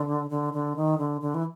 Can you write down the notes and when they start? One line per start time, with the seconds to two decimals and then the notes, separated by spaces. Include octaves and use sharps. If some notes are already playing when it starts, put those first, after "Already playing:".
Already playing: D3
0.30 D3
0.53 D3
0.76 D#3
0.98 D3
1.21 D3
1.34 E3